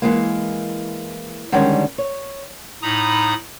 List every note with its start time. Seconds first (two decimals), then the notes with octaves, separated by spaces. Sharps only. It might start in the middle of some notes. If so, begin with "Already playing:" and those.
0.02 E3 G#3 A#3
1.52 D3 D#3 G3 G#3 C#4
1.98 C#5
2.82 A2 D#4 A#5 B5 D#6